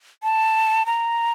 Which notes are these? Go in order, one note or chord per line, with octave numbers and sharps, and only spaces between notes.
A5
A#5